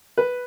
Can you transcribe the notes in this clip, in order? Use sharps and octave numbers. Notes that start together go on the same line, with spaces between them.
B4